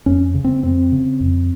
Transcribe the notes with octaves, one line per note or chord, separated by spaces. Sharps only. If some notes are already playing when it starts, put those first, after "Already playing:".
F2 C#4
C#3
C4
F2 C4
C#3
F2